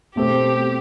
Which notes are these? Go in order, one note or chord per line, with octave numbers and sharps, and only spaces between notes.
B2 A3 C4 G4